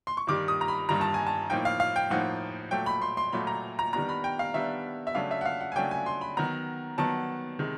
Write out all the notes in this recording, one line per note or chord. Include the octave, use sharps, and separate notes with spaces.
C6
C#6
G2 D#3 G3 D6
D#6
A#5
B5
G2 D#3 G3 A#5
A5
G#5
A5
A2 F3 A#3 D#4 G5
F5
F5
G5
A2 F3 A#3 D#4 F#5
A#2 F#3 A3 G5
B5
C6
C6
A#2 F#3 A3 B5
A#5
A#5
D#3 G3 B3 D4 A#5
B5
G5
F5
D#3 G3 B3 D4 E5
E5
C#3 F#3 A3 D4 F5
E5
F#5
F5
F#5
G#5
C#3 F#3 A3 D4 G5
G#5
C6
B5
D#3 F#3 B3 A#5
D#3 F#3 B3 A5
C3 D#3 G#3